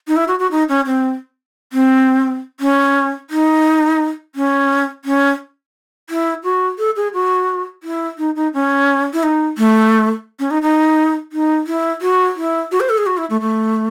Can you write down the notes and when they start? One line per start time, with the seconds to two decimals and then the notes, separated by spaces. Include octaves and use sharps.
0.08 D#4
0.16 E4
0.28 F#4
0.39 F#4
0.51 D#4
0.69 C#4
0.86 C4
1.73 C4
2.60 C#4
3.30 D#4
4.35 C#4
5.05 C#4
6.10 E4
6.44 F#4
6.78 A4
6.96 G#4
7.14 F#4
7.83 E4
8.18 D#4
8.36 D#4
8.54 C#4
9.13 E4
9.23 D#4
9.58 A3
10.39 C#4
10.51 D#4
10.62 D#4
11.32 D#4
11.67 E4
12.02 F#4
12.36 E4
12.71 F#4
12.80 C5
12.89 A4
12.98 G#4
13.06 F#4
13.17 E4
13.30 A3
13.41 A3